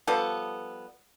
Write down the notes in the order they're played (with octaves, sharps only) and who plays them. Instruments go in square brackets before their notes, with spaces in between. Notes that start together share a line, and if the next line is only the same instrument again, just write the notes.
[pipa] F3 G3 B3 A4